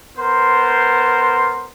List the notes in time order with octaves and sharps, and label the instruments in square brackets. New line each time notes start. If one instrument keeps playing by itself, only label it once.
[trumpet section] B3 A#4 C5